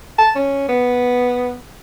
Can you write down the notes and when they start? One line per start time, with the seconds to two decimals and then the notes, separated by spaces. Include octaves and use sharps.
0.18 A5
0.35 C#4
0.68 B3